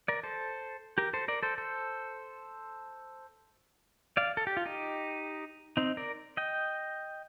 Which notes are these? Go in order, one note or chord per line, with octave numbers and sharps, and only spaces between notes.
A#4 D5
A4 C5
G4 A#4
A4 C5
A#4 D5
A4 C5
A4 C5
D5 F5
A4
G4
F4
D#4 G4
C4 D#4
A#4 D5
D#5 G5